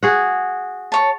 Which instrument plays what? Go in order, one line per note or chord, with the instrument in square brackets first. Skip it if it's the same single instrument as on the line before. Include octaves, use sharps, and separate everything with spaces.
[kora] F#4 G#4 F#5
[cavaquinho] C#5 A5